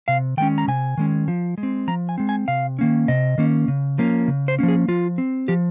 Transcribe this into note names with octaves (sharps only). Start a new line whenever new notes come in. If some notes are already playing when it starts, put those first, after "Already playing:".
C3 F5
D#3 G#3 C#4 G5
A#5
C3 G#5
D#3 G#3 C#4
F3
G#3
C4
F3 A#5
G#5
G#3 C4
G#5
C3 F5
D#3 A#3 C#4
C3 D#5
D#3 A#3 C#4
C#3
F3 A#3 C#4
C#3
C5
F3 A#3 C#4
G#4
F3 F4
C4
F3 G4